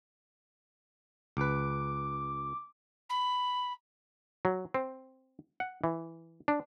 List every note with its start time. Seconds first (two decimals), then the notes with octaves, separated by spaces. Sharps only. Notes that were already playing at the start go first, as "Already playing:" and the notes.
1.37 C#2 B4 D6
3.09 B5
4.45 F#3
4.74 C4
5.60 F#5
5.84 E3
6.48 D4